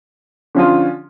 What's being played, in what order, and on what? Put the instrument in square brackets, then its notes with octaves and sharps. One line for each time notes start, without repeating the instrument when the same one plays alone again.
[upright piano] D3 F3 C#4 F4